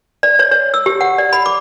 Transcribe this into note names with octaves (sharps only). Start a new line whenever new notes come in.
D5
C#5
C#5
E6
G4
F#5
D5
B5
D6